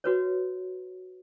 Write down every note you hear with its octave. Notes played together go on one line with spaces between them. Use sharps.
F#4 B4 C#5